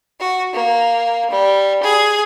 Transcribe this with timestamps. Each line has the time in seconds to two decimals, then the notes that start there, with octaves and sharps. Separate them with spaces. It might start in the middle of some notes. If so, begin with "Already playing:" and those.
0.20 F#4
0.55 A#3
1.31 G3
1.84 G#4